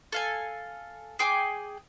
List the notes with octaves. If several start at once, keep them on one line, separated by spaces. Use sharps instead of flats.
A4 F5 G#5
G#4 G5 G#5 D6